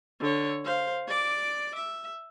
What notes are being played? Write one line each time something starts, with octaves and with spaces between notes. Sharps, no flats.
D3 C#5
C5 F5
D5 D6
E5